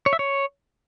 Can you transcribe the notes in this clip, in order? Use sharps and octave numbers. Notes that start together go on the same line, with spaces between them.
C#5
E5
C#5